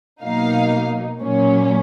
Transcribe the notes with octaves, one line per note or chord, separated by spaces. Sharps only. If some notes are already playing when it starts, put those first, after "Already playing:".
B2 F#3 A#3 D#4 F5
A#2 F#3 A#3 C#4